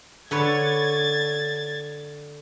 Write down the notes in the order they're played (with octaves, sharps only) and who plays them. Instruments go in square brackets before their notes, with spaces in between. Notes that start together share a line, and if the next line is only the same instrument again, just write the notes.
[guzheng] D3 B4 C#5 [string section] G#6 A6